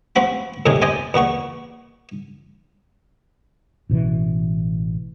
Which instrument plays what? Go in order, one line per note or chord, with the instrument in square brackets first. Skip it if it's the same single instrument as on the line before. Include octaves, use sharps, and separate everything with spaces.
[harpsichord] F3 C4 F#4 B5
F2 A2 C3 D#3 G#4
C5 D5 D#5 G#5 C6
E2 A#2 F#4 C#6
[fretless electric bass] A1 B2 D3 E3